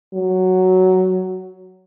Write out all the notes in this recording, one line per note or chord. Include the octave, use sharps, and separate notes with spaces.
F#3